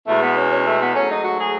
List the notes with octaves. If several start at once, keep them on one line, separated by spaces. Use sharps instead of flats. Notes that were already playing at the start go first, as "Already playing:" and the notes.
E2 B2 G#3 A3
B3
C#4
C#4
A3
B3
G#2 F#3 A3 C#4
D#4
F#4
G#4